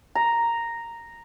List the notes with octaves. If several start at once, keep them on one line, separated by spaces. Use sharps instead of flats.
A#5